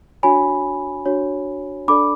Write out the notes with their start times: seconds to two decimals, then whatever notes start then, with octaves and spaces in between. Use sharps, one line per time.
0.23 D4 F#4 C#5 G#5 B5
1.06 D4 F#4 C#5
1.88 D4 A4 D5 B5 D6